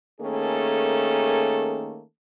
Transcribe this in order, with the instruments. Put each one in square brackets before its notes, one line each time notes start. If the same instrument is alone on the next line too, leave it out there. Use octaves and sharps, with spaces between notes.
[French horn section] D#3 A3 A#3 C#4 G#4 A4